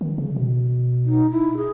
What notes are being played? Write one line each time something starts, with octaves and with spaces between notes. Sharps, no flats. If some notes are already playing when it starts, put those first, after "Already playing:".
D#3
C#3
B2
D#4
E4
G#4